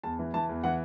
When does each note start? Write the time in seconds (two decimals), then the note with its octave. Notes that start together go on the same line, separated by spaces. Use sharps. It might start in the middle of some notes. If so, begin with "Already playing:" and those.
0.04 E2 A5
0.19 E3
0.34 E3 A5
0.49 E2
0.64 E3 F#5